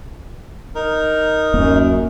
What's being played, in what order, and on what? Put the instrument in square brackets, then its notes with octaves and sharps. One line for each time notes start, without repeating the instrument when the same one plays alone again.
[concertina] D#4 A#4
[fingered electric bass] D1 A#3 [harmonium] F#2